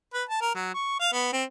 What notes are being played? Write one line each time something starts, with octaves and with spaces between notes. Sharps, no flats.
B4
A5
A#4
F#3
C#6
F5
B3
C4